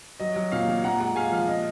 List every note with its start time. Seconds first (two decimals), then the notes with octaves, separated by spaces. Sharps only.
0.20 F#3 D#5
0.36 F#3
0.52 A#2 F5
0.68 A#2
0.84 A#2 F#5 A#5
1.00 G#3 F#5 A#5
1.16 G#3 F5 G#5
1.32 F3 F5
1.48 A#2 D#5